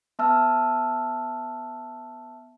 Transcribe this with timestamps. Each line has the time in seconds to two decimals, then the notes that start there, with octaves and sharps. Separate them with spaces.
0.19 B3 E5 A5 E6 F6